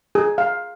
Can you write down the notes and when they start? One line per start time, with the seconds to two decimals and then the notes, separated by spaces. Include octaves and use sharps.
0.15 G#4
0.38 F5